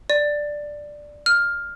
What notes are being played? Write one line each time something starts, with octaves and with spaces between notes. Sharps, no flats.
D5
F6